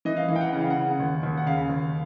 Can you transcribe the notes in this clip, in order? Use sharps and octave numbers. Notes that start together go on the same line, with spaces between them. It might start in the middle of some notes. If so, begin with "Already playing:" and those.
E3 D#5
F5
E3 F5
G5
F#5
C#3 F#5
F5
F#5
C#3
D#2
D#2
F#5
C#3 F5
D#2